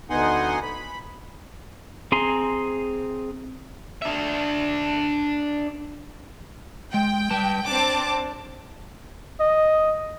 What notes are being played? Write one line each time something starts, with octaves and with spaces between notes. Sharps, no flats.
D2 B3 D#4 F#5 G#5 C6
B5
C4 G#4 G#5 A#5 C6
D4 E5
G#3 G5
G3 B4 A5
C4 D4 A5 D6
D#5